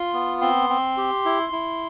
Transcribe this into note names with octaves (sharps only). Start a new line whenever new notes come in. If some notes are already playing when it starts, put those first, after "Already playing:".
Already playing: F4 C6
B3
C4 C6
C4
G4
E4
E4